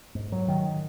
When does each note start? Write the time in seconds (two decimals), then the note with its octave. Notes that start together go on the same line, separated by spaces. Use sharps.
0.15 G#2
0.32 F#3
0.48 D#3